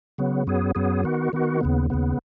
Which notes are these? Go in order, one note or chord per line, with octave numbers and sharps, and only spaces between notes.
C#3 F#3 B3
F#2 F#3 B3 G#4
F#2 F#3 B3 G#4
D#3 B3 F#4
D#3 B3 F#4
D#2 C#3 B3
D#2 C#3 B3